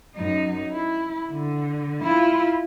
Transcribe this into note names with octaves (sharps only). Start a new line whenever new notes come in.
F#2 D#4
E4
D3
E4 F4